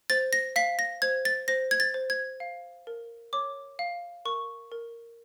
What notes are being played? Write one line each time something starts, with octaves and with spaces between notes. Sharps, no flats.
C5 A6
A#6
F5 B6
A#6
C5 G#6
A6
C5 A#6
G#6
A6
C5
G#6
F5
A#4
C#5 D6
F5
A#4 C#6
A#4